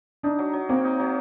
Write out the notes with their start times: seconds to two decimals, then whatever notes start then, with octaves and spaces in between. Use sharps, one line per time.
0.23 D4 D#4
0.39 F#3
0.53 F#3
0.69 A#3 C4
0.84 D#4
0.99 F#3